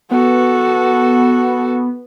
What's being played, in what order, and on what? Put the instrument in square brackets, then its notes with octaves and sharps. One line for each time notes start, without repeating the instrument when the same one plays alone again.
[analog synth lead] B3 [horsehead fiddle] F#4 A4